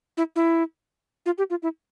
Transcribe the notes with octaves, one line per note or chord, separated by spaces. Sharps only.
E4
E4
F4
G4
F4
E4